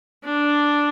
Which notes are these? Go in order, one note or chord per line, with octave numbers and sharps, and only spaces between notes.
D4